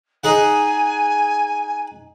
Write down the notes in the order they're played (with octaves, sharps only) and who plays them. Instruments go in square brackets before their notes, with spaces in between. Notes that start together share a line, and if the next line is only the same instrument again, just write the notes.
[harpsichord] D#4 G#4 F#5 [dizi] G#5